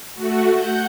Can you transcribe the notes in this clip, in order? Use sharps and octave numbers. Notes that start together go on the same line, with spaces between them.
A3 F#4
F#5 G6